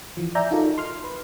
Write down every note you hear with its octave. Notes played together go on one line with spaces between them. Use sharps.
E3 F3
D5 E5 G#5 A#5 G6
D#4 F4 F#4 A4 A#4
C6 F6
B4